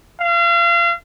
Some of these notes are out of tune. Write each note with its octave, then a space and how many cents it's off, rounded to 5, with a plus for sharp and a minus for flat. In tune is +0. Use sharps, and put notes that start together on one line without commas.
F5 -35